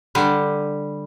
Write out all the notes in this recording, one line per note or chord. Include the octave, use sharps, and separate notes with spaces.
D3 G3